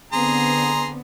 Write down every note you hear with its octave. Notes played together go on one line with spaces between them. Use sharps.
D3 B3 C4 G#4 A#5 C6